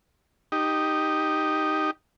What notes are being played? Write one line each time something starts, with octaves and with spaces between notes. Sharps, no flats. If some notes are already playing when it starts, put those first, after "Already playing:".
D#4 G4